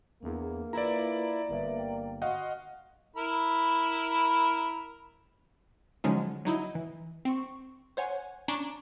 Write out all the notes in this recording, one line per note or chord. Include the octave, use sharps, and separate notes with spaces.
E2 A#3 D4 G#4
E4 F4 B4 D5 A#5
G1 A#3 B4 E5
G5
F#4 D#5 F5 F#5 C6 C#6
E4 A#4 B5
D3 F3 F#3 G#3 C#4 D#4
F#3 D#4 E4 D#5
E3
C4 C#6
C5 C#5 F#5 G#5
C#4 D4 A#5 C#6